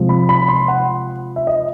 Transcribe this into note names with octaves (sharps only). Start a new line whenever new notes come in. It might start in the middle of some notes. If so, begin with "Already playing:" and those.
Already playing: C3 F3 G#3
B5
B5
C6
F#5
E5
D#5